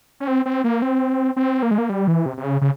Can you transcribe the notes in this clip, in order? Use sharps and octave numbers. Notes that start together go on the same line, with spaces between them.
C#4
C4
C4
A#3
C4
C4
A#3
G#3
A#3
G3
E3
C3
C3
C#3
C#3